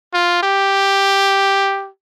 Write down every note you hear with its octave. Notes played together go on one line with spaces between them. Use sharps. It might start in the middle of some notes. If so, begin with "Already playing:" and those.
F4
G4